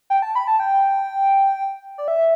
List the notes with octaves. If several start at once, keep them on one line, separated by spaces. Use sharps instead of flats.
G5
A5
B5
A5
G5
D5
E5